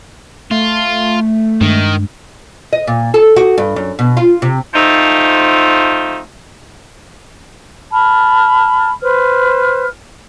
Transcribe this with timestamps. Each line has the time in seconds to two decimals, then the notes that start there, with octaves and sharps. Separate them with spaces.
0.51 A3 F4
1.61 G2 D#3 G#3 D4
2.73 D#5
2.87 A#2
3.14 A4
3.36 F#4
3.58 G2
3.76 F#2
3.99 B2
4.17 F4
4.42 C3
4.74 F3 A3 C4 D#4 F4
7.92 A5 B5 F6
9.01 B4 C5 F6